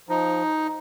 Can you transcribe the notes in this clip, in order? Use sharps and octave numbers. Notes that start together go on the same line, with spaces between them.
F3 D#4